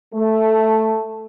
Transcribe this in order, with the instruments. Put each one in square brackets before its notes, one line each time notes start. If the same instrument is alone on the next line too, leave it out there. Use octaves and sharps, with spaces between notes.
[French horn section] A3